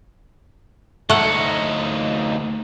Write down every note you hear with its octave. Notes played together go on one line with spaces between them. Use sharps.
D2 A3 D#4 F#5